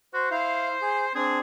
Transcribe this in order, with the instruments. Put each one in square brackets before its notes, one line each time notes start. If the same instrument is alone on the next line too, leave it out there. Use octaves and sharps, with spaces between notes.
[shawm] F#4 [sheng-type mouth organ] C5
[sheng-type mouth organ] E4 F5 [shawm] C5
[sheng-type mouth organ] G#4
[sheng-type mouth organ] C4 D4 [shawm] G#4